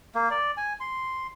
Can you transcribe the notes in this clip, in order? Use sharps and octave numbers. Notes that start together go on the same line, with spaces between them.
A#3
D5
G#5
C6